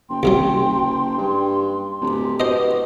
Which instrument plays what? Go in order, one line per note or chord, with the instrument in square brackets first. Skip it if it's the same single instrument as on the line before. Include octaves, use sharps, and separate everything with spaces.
[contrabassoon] F#1 [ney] G5 [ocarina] C6
[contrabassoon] F#1 [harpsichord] C2 C3 F#3
[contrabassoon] G2
[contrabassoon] D1 [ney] G4
[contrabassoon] B2 [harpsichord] C5 D#5